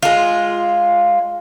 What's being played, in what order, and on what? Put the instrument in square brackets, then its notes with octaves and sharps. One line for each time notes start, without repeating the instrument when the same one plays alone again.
[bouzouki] G#3 F4